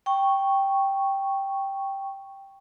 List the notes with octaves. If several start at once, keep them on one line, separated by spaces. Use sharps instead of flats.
G5 C#6